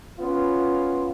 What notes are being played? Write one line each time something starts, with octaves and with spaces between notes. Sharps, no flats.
B3 C#4 F4